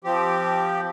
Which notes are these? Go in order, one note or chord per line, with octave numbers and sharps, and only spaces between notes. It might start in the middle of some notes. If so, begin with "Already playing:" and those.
F3 C4 G4